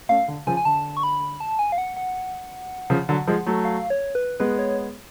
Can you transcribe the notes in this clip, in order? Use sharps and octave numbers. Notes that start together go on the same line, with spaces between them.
A3 C#4 F5
D3
C#3 F3 G#5
G#5
D3 A5
C#6
B5
A5
G#5
F5
F#5
F#5
C#3 F3
D3 F#3
F3 G#3
F#3 A3
F5
C#5
B4
G#3 B3 B4
C#5